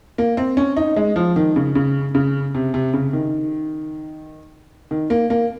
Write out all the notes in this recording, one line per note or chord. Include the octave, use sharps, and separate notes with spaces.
A#3
C4
C#4
D#4
G#3
F3
D#3
C#3
C#3
C#3
C3
C3
C#3
D#3
D#3
A#3
A#3